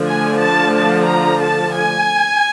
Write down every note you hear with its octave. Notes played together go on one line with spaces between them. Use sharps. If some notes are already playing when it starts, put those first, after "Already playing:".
Already playing: D3 F3 A3
G#5
A5
A5
A#5
A5
G#5